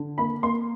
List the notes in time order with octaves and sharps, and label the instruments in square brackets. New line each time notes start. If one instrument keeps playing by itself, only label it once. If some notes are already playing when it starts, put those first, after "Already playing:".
Already playing: [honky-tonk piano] D3
A#3 B5
A#3 C6